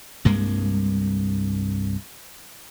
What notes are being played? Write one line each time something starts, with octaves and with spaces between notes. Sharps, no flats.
C2 G2 G#3 A#3